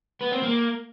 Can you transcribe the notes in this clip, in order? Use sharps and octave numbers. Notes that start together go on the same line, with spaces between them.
B3
C4
A#3